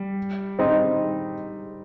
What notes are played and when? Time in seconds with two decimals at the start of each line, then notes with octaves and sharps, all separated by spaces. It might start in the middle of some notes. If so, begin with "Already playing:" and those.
Already playing: G3
0.59 C4 D#4